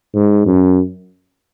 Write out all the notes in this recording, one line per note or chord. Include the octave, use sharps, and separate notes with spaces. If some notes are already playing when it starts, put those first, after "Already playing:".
G#2
F#2